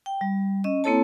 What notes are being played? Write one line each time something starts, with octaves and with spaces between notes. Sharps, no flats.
G5
G3
C#4 D#5
A#3 C4 E4 A4 C#5 A5